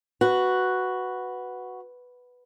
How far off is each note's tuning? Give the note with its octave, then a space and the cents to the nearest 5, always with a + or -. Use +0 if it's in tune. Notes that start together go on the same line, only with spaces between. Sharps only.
F#4 +0 B4 +0